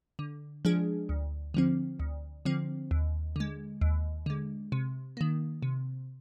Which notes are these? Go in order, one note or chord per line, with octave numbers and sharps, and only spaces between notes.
D3
F3 G#3 D4 G#4
D2
D3 F3 C4
D2
D3 F3 C4
D#2
D3 G#3
D#2
D3 G#3
C3
D#3 A#3
C3